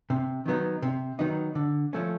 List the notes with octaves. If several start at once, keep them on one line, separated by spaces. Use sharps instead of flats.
C3
D#3 F#3 B3 D#4
C3
D#3 F#3 B3 D#4
D3
F3 A3 C#4